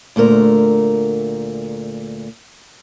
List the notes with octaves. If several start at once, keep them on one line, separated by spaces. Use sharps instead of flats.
D2 A#2 A3 A#4